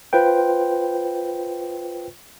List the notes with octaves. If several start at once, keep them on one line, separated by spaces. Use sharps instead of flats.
F4 B4 C5 G5